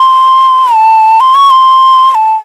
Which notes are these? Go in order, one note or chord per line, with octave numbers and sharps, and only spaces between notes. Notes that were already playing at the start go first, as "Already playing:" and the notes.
Already playing: C6
A5
C6
C#6
C6
C6
A5